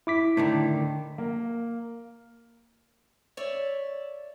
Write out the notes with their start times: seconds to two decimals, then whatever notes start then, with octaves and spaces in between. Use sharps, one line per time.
0.07 E4 D6 B6
0.37 A2 D3 D#3
1.18 A#3
3.37 C#5 D5 E5